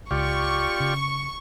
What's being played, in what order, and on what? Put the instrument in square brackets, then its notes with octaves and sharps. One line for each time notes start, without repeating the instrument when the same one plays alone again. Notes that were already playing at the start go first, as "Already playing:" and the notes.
[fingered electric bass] C#2 [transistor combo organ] F4 G4 D5 [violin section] C#6
[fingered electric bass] C#3